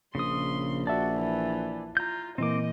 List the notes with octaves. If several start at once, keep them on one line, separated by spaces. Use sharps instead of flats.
A#1 C#3 C6 D#6
F#4 D5 E5 A5
E3
F4 A#5 G6
A#2 E3 A#3 C4 D#5 D6